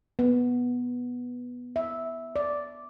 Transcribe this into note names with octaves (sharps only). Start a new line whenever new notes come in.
B3
E5
D5